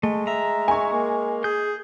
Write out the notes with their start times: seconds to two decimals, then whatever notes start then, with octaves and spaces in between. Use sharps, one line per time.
0.03 G#3 A3
0.27 E5 A#5
0.68 G#5 C#6
0.92 A#3
1.44 G#4 G6